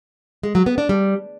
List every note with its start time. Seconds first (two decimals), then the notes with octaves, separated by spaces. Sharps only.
0.43 G#3
0.55 F#3
0.66 B3
0.78 D4
0.89 G3